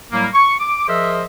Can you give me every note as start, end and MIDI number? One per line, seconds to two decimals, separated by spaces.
0.12 0.27 45
0.12 0.27 54
0.12 0.27 55
0.12 0.27 58
0.34 0.53 85
0.60 0.85 86
0.88 1.24 53
0.88 1.24 68
0.88 1.24 70
0.88 1.24 72
0.88 1.24 75
0.88 1.24 76